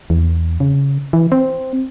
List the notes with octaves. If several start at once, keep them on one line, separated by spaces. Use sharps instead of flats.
E2
C#3
E3
C4